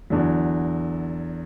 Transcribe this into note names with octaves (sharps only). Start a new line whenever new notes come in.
E2 D3 F#3